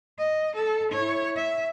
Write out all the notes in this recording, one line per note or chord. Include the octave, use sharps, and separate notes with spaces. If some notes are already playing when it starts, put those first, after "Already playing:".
D#5
A4
E4 C#5
E5